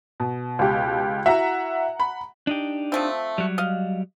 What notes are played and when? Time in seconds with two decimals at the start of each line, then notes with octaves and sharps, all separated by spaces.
0.20 B2
0.59 C#2 G4
1.26 E4 F#4 E5 F#5 A#5
2.00 B5
2.47 D4 D#4 G4
2.92 F3 A3 C4
3.38 F#3 G3
3.58 D#5 F5